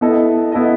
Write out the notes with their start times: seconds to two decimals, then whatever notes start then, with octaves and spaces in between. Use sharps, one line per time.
0.01 B3 E4 A4 D#5
0.52 B3 E4 A4 D#5